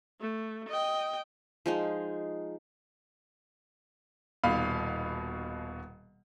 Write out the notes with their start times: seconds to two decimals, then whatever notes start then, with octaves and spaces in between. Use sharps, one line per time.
0.21 A3
0.69 D#5 G5
1.66 F3 G#3 D#4
4.44 D#1 B2 F5 B5